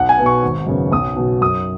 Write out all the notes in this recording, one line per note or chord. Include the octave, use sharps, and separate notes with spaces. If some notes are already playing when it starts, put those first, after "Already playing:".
Already playing: B1 F#5
G#5
B2 B3
C#6
G#1
F#2 C#3 B3
B1 D#6
B2 F#3
F#2 D#6